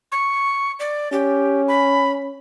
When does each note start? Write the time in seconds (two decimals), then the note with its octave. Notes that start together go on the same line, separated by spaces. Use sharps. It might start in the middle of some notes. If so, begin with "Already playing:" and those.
0.12 C#6
0.80 D5
1.12 C#4 G4
1.68 B5